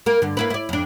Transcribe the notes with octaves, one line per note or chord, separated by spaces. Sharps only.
A#3 A#4
G2 D3
A#3 E4 B4
E4 D5
F2 D4